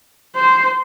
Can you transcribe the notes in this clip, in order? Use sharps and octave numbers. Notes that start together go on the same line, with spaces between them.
C5